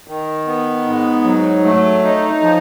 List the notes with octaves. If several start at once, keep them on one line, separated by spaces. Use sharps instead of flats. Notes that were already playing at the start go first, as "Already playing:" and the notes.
D#3
B3
G#2
F#3
A3
D#4
F3